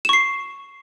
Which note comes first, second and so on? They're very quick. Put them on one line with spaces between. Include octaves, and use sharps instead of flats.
E7 C#6 C7